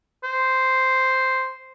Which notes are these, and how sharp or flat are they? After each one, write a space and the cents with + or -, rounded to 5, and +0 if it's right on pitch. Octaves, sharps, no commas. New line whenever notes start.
C5 -5